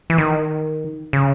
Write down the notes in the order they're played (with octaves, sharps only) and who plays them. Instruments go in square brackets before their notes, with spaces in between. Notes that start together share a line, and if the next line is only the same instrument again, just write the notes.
[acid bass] E3
D#3
C#3